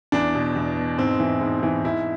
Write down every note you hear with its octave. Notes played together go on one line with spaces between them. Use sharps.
E2 D4
B2
E2
B2
G#2 C4
E3
G#2
E3
G#2 E4